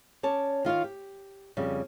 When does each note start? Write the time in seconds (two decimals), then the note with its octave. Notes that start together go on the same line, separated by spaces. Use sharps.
0.23 C#4 C#5 D5 A5
0.65 D#3 F4 C#5 F5
0.84 G4
1.57 F2 C#3 G3